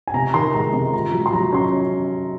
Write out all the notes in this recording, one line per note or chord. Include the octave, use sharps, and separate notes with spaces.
G#5
C3 A#5
D#3 C6
G#3 A#5
C3 A#5
F4 A#5
F#3
C6
F#3 A#5
C#4 C6